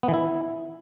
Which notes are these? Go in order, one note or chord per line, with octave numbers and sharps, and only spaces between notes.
B3
E3
E4